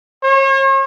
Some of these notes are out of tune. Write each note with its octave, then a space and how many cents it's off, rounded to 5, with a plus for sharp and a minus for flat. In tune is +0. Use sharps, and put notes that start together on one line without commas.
C#5 -40